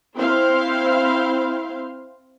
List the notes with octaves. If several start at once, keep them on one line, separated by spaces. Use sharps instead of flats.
C4 E4 C5 F5